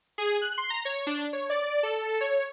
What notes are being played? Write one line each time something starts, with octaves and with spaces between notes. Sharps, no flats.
G#4
F#6
C6
A#5
C#5
D4
C#5
D5
A4
C#5